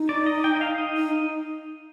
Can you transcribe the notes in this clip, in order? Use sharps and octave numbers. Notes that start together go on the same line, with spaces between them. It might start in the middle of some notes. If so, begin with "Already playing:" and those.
Already playing: D#4
D5
D#5
G5
D#5
F5
D#5
D#4